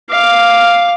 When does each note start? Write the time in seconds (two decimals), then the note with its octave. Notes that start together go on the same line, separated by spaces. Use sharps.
0.10 F5 D6